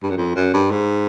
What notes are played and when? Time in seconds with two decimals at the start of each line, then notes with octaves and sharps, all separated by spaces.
0.03 G2
0.10 F#2
0.17 F2
0.35 F#2
0.54 G2
0.71 G#2